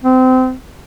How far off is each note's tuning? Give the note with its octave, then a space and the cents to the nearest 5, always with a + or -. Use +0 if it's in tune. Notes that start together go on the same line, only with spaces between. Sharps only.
C4 -25